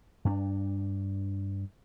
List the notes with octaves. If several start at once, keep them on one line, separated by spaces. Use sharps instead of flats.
G2 C#4 D4